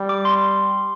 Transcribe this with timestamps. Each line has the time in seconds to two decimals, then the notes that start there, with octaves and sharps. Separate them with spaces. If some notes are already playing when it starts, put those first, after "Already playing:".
Already playing: G3
0.09 D6
0.25 C6